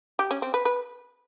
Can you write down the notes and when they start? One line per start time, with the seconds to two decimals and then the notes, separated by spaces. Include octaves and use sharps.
0.19 G4
0.31 C#4
0.42 C4
0.54 B4
0.65 B4